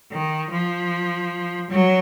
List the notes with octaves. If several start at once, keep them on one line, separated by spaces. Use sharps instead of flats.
D#3
F3
F#3